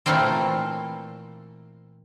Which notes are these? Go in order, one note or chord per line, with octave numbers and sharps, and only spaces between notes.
A#2 E3 A3 A#3 C4 A4